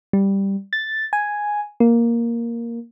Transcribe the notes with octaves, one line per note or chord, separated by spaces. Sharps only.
G3
A6
G#5
A#3